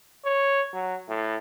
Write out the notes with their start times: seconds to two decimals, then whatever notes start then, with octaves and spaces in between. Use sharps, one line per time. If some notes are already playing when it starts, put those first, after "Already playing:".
0.25 C#5
0.73 F#3
1.08 A2